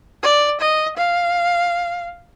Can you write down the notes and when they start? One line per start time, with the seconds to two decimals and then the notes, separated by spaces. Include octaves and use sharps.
0.23 D5
0.61 D#5
0.97 F5